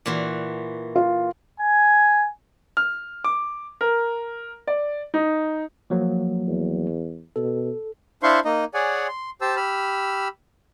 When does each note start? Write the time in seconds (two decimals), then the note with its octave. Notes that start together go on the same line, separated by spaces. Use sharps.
0.06 A#2 E3 F#4
0.96 F4
1.60 G#5
2.77 F6
3.24 D6
3.81 A#4
4.67 D5
5.14 D#4
5.90 F3 F#3 A#3
6.47 E2
7.36 B2 A4
8.23 D4 E4 C5 F5 C6 C#6
8.45 A#3 D#4 D#5
8.74 G#4 C#5 D5 F#5 G#5
9.08 C6
9.41 G4 C5 A5 E6
9.56 G4 B5 E6 F6